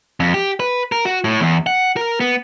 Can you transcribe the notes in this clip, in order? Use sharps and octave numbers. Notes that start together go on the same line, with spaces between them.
F2
G4
B4
A#4
F#4
A2
E2
F#5
A#4
B3